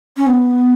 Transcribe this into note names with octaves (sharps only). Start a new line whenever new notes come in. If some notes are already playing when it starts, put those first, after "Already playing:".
C#4
B3